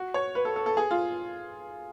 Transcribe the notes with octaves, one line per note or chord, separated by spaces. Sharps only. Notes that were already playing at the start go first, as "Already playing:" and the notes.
Already playing: F#4
C#5
B4
A4
A4
A4
G#4
F4